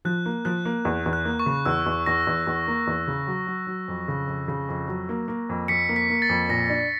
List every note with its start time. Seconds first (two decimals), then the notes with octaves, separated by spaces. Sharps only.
0.05 F3 F#6
0.26 A#3
0.45 F3 F#6
0.65 A#3
0.85 E2
1.06 E2
1.13 F#6
1.25 A#3
1.39 C#6
1.46 C#3
1.65 E2 E6
1.86 E2
2.06 E2 A#6
2.27 E2
2.47 E2
2.67 A#3
2.87 E2
3.07 C#3
3.27 F#3
3.47 F#3
3.67 F#3
3.88 F2
4.08 C#3
4.27 F2
4.48 C#3
4.69 F2
4.88 F#3
5.09 A#3
5.28 A#3
5.49 F2
5.68 F2 B6 C#7
5.89 A#3
5.96 B6
6.10 A#3
6.22 A6
6.29 F2
6.49 A#2 A#6
6.69 D4